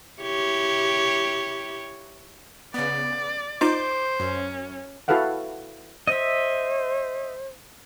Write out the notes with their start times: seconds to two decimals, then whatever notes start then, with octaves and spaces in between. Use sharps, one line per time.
0.21 E4 G4 C#5
2.74 C#3 B3 D5
3.61 D#4 F4 C5 D#5 D6 G6
4.20 F#2 C#4
5.08 E4 F#4 A4 B4 F5 F#5
6.07 C5 D#5 E5